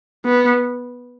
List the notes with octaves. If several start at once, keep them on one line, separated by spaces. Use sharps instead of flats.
B3